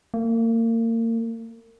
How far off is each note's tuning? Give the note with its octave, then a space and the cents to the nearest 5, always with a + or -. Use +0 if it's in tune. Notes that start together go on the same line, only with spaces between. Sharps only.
A#3 -35